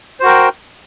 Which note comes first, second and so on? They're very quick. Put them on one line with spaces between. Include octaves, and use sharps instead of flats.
C5 F#4 A#4 G5